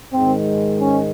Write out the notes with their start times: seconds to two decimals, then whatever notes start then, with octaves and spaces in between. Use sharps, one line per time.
0.13 G#2 D#3 G#3 C4
0.81 C#4